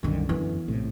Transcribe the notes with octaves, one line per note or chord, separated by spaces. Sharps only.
C2 F#2 D3 D#3
E3 B3
A#1 A2 C3